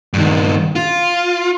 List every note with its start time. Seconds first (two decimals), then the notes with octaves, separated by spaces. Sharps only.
0.13 G2 D#3
0.75 F4